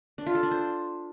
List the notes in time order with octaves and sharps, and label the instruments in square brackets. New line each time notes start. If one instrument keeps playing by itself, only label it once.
[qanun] D4
F4
A4
D4
C5